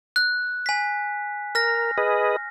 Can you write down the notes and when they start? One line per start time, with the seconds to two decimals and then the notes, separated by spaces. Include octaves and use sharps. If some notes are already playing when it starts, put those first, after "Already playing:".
0.16 F#6
0.66 G#5 B6
1.55 A#4 F6 A#6
1.98 G#4 B4 D#5